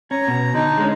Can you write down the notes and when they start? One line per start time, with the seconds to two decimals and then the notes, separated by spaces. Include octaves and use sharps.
0.11 C#4 A#5
0.28 B2
0.54 D3 D#4
0.78 G#3 B3 C#4